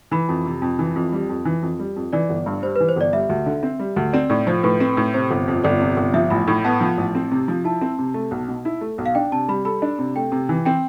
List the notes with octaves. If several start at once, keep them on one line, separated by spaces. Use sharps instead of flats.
E3 B5
F2
C3
F2
E3
F2
G3
F2
E3
F2
G3
F2
E3 D5
G1
G2
G3 C5
E3 B4
C5
G1 D5
G3 E5
D2
D3
C4
G3
D2
C4 D5
A2 D5
F3 C5
A2 B4
C4
A2
C3 C5
G1
F2
G1 D5
C3
G1
F3 E5
A1 B5
A2 B5
B3 A5
F3
A1
C4
C3
F3
E4 A5
C4
C3
A3
B1
B2
E4
A3
B1
F5
D4 G5
C3 A5
G3 B5
A4 B5
D4
C3
A3 G5
C3
E3
C4 G5